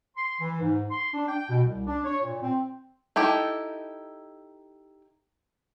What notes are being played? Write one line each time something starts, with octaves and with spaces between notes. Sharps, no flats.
C6
E3
G#2
C6
D4
G5
B2
C2
D4
C#5
A#2
C4
D#4 E4 G4 A4